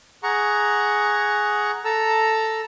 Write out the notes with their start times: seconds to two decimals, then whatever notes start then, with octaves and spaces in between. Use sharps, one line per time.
0.23 G#4 F#5 A#5 C#6
1.85 A4 A5 A#5 E6